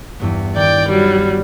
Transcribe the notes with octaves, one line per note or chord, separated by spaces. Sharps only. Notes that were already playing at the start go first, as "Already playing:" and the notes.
E2 G2 B3
D#3 D5 G5
F#3 G3 D5